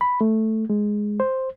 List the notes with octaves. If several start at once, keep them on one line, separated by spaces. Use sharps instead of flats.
B5
A3
G#3
C5